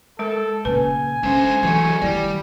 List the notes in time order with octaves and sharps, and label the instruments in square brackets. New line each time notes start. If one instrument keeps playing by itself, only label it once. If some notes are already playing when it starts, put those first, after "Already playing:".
[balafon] G#3 A#4 [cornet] A4
[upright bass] A#2 C#3 [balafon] B4 [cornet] G#5
[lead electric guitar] D3 C5 [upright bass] G#3 C#4
[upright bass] E3 [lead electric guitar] F#3 A3
[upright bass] D#3 E4 [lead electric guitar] G3 [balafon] D5